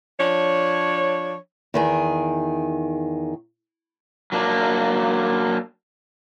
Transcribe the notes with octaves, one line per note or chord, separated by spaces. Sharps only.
F3 D4 C#5
E2 D#3 G#4
F#3 A#3 D4